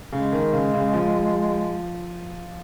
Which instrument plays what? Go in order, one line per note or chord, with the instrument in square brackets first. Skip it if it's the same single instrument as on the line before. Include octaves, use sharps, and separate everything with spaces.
[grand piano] C#3 [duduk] G#3
[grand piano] D#3
C#3
C#3
F3